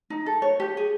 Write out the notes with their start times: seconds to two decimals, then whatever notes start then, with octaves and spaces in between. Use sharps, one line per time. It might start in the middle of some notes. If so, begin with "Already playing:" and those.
0.10 D#4
0.26 A4
0.42 C#5
0.60 G4
0.77 G#4